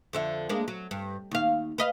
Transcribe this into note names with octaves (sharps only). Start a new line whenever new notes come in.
F2 D3 E5
G#3 A#3 D4
F#3
G2
D#2 F5
B4 D#5 F5